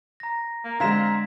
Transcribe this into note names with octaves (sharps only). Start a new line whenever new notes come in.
A#5 A#6
A#3
D3 G#3 C4 F5 A#5 G#6 B6 E7